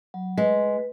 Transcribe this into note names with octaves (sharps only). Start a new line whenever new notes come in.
F#3
G#3 B4